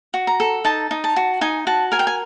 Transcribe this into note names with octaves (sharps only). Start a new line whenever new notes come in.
F#4
A#5
A4
D#4 A5
D#4
A5
F#4
D#4 G#5
F#4 A5
A#4 G#5
G5
G#5